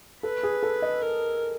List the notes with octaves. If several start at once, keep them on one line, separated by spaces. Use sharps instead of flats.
A4 B4
G#4
A4
D#5
A#4